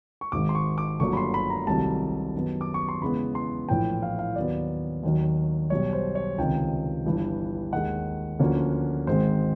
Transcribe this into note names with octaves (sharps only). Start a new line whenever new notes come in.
C#6
G#1 G#2 D#3 D6
C6
C#6
D6
G1 G2 D3 F#3 A#3 C#6
B5
C6
B5
A#5
C2 C3 D#3 F#3 A3 A5
F#2 D#3 F#3 B3
D6
C#6
C6
E2 C#3 E3 G#3 B3 B5
C6
A#1 A2 E3 G5
F5
F5
D#2 D#3 F#3 B3 D5
D#2 D#3 F#3
B1 B2 G3 C#5
C5
C#5
C#2 C3 D#3 G5
G1 G2 E3
D#2 D#3 G#3 F#5
D2 D3 F3 A#3 C#4
G#1 G#2 D#3 G#3 C4 C5